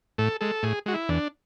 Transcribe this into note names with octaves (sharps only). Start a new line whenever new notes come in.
A2 A4
G#3 A4
A2 G#4
G#3 F#4
E4
E2 D4